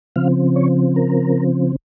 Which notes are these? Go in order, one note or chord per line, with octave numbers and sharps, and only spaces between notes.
C#3 F3 C4 F5
C#5
A#4